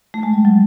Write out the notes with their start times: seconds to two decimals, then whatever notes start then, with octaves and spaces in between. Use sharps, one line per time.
0.14 A3
0.23 G#3
0.33 G3
0.45 F#3